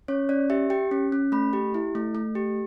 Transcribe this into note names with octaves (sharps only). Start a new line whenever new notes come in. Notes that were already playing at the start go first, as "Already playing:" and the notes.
C#4 C#5
C#4 D5
G4 E5
G4 G5
C#4
C#4
A3 B5
G4
E4
A3
A3
G4